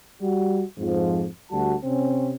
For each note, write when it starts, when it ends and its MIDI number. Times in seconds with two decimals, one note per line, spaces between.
0.22 0.63 55
0.22 0.63 66
0.78 1.27 41
0.78 1.27 44
0.78 1.27 53
1.51 1.75 38
1.51 1.75 55
1.51 1.75 66
1.51 1.75 81
1.84 2.35 48
1.84 2.35 60
1.84 2.35 61